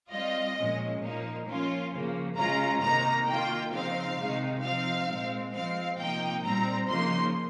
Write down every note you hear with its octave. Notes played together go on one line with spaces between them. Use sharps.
G3 C4 F4 D#5
A#2 F3 G#3 C#4
A#2 F3 A#3 D#4
F3 A#3 C#4 F4
C#3 F3 A#3
C#3 G#3 C#4 F4 A#5
C3 D#3 A#3 D#4 A#5
D#3 A#3 F4 G5
C#3 F3 C4 D#4 F5
C3 D#3 G#3 D#4
F3 C4 D#4 F5
A#2 G#3 C4
F3 G#3 C4 F5
C3 F3 A#3 D#4 G5
A#2 G3 C4 A#5
C#3 F3 A#3 D#4 C6